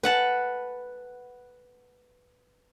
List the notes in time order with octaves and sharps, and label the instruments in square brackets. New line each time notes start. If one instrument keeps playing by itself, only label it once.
[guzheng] B4 F#5 A5